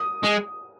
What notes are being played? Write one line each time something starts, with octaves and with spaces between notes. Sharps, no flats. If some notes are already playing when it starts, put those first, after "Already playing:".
Already playing: D#6
G#3